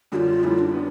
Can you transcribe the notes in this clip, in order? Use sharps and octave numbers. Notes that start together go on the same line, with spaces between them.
F#2 D3 G3 F4 F#4
F#2 D3 G3 E4
D4
B3